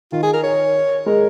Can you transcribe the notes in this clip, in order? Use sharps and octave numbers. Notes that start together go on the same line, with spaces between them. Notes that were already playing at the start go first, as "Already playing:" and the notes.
D#3 F4
G#4
A#4
C#5
G#3 A#4